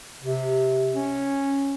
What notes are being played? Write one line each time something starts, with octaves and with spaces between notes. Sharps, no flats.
C3
C#4